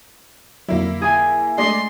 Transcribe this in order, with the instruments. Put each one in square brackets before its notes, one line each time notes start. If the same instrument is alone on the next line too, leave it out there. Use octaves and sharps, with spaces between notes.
[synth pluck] F2 D3 F#3 [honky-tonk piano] A#3 E4
[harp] G#4 G#5
[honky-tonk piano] G#3 D5 D#5 [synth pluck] A3 D4 [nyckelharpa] C6